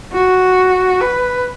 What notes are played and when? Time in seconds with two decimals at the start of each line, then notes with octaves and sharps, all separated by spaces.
0.13 F#4
1.01 B4